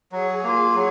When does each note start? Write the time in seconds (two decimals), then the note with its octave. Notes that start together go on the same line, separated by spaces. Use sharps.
0.11 F#3 G#4
0.43 A#3 F4
0.75 F#3